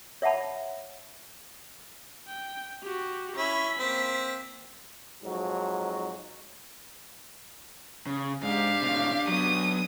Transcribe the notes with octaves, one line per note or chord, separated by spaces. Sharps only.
C#5 E5 F#5 A5 B5
G5
F#4 G4
C#4 E4 B6
A#3 C4
F2 G#2 F#3
C#3
G#2 D4 G4 F5
A2 C3
F#3 B3 D#6